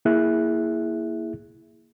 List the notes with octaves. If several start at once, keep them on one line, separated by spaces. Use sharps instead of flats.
A#3 E4 G#4 E5 F#6